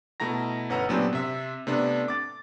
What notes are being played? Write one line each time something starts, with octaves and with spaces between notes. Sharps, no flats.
B2 A3 E4 A#5 A#6
G1 C#4 B4 F#5 A#5 E6
A#2 F#3 B3 C4 D4 G4
C3 E5 E6
C3 A3 B3 D4
D6 A6